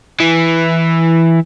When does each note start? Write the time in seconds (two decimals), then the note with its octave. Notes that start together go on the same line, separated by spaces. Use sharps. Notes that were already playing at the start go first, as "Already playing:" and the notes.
0.20 E3